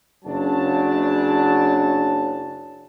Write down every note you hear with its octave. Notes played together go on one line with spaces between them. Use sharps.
F#1 C#3 F#3 D4 A5